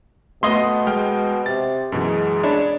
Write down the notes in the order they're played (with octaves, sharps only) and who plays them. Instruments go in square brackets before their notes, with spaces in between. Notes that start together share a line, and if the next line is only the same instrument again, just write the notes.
[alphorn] B2 [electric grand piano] A3 B3 [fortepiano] D#5 C6
[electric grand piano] G#3 G5 F6
[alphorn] C3 [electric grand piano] A6
[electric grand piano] F#2 B2 E3 [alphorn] G#3
[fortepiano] D4 [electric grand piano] C#5 B5